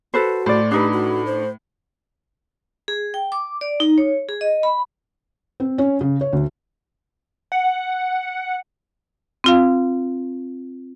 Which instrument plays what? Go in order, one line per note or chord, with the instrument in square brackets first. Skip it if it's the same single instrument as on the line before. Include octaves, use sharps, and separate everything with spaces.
[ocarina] F#4 [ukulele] A4 B4 C5
[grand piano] A2 [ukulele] C5 D5
[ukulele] D4 D#4 B4 [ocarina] G4
[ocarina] F#4
C5
[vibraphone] G#4
G5
D6
D5
D#4
C#5
G#4
D#5
B5
[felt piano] C4
C#4
C#3
C#5
D2
[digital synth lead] F#5
[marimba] C4 F4 F5